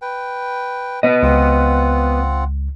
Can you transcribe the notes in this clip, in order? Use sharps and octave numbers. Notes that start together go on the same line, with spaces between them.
B4 G5
B3 D#5
C#2 C4 F4 F#5